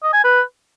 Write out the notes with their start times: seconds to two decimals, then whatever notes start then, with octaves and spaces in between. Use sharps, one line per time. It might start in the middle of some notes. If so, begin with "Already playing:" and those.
0.03 D#5
0.13 G#5
0.24 B4